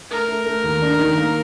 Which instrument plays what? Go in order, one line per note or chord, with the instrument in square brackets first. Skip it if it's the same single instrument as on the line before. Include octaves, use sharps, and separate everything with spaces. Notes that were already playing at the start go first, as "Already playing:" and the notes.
[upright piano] A3 [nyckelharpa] A#4
[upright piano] A3
A3
D#2
D4
D#3
A#3